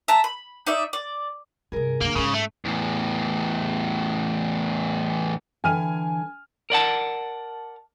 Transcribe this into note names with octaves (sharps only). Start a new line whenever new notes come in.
E5 A5 A#5
B5
D#4 D5 E5
D5
G2 C3 G#4 A#4
F#2 D3 A#3
G#2 C#3 C#4
A3
E2 A2
D3 E3 G5 G#5 F6 D#7
A#4 D5 F#5 A5